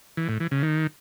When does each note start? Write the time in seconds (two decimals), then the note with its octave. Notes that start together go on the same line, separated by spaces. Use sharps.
0.17 E3
0.29 A2
0.40 E3
0.51 C#3
0.63 D#3